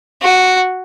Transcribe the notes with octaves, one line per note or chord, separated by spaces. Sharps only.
F#4